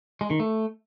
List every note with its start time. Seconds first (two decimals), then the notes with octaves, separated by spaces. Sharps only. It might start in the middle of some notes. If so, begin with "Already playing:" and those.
0.21 G#3
0.30 D#3
0.40 A3